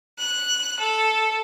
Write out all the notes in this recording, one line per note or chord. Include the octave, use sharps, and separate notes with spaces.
F#6
A4